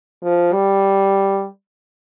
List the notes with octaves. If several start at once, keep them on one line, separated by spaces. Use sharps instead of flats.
F3
G3